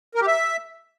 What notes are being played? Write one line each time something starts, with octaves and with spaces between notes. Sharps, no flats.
A#4
G4
E5